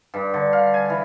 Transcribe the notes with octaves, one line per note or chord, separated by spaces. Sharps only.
G2
D3
F5
G#5
E3